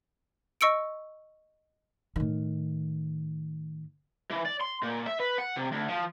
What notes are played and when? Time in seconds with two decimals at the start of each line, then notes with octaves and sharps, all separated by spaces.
0.61 D#5 C#6 E6 C#7 D7
2.16 A2 D#3
4.30 E3
4.45 D5
4.61 C6
4.83 A#2
5.07 E5
5.20 B4
5.39 F#5
5.57 C3
5.72 D2
5.89 F3